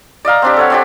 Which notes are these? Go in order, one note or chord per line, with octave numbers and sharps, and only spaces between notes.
D5 D#5 F5 A#5
C4 D4 G4
A4 C#5 F#5
C4 D4 G4